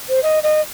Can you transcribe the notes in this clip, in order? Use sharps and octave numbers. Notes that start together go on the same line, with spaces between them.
C5
D#5
D#5